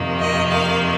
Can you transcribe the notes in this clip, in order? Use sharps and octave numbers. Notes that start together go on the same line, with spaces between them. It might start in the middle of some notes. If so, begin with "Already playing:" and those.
Already playing: F2 C3 D#3 A#3
D#5
F5